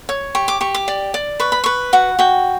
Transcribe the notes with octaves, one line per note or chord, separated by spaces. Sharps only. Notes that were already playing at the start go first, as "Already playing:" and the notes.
C#5
G4 C#6
D6
G4 C#6
D6
D5
D5
B4 C#6
B5
B4 C#6
F#4 F#5
F#4 G5